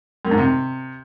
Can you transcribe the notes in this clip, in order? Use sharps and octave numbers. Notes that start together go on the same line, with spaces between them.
F#2
G#2
C3